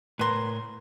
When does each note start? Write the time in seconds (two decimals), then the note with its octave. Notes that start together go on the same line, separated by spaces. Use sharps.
0.19 A2 A#4 B4 C6